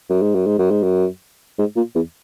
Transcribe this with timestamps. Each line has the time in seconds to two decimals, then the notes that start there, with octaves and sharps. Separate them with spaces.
0.10 F#2
0.22 G#2
0.35 F#2
0.46 G#2
0.59 F#2
0.71 G#2
0.83 F#2
1.58 G#2
1.76 A#2
1.95 E2